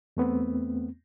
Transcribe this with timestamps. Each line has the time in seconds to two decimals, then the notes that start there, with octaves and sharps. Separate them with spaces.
0.17 E2 A3 B3 C4